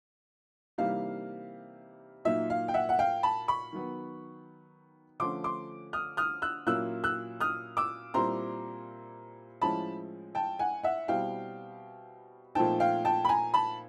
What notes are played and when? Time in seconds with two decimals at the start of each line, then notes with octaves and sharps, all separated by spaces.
0.78 C3 E3 G3 A#3 D#4 F5
2.25 A#2 F#3 A#3 D#4 E5
2.50 F5
2.68 G5
2.74 E5 F#5
2.89 F#5
2.99 F5 G5
3.23 A5 B5
3.48 B5 C#6
3.72 D#3 F#3 B3
5.20 D3 F3 A3 C#4 C6 D6
5.44 C6 D6
5.93 D#6 F6
6.17 D#6 F6
6.42 E6 F#6
6.66 A#2 F#3 A#3 C#4 E4 E6 F#6
7.04 E6 F#6
7.40 D#6 F6
7.77 D6 E6
8.14 A#2 G3 C4 E4 A#5 C6
9.62 A2 F3 G#3 C#4 E4 A5 B5
10.35 G5 A5
10.59 F#5 G#5
10.83 E5 F#5
11.08 B2 G3 C4 E4 F5 G5
12.55 A#2 F3 A3 C4 D#4 G5 A5
12.80 F5 G5
13.05 G5 A5
13.25 B5
13.29 G#5 A#5
13.54 A5 B5